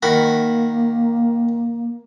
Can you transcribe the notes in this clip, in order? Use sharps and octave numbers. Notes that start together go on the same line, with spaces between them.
D#3 A#3 F#4 B5